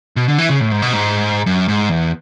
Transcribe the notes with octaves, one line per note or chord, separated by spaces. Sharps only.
B2
D3
E3
C#3
A2
G#2
B2
G#2
F#2
G#2
E2